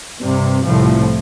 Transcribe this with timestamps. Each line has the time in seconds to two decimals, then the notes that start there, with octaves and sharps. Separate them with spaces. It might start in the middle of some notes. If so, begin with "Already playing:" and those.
0.19 G2 C3
0.64 C2 A2 F3